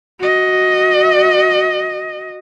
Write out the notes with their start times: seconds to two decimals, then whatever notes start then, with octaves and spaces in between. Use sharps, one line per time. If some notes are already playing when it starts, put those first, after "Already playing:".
0.20 F#4 D#5